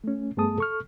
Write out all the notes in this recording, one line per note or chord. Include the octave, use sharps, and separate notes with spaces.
A3 C#4
G2 A3 B3 G#4 A5 D#6
A4 C#6 F6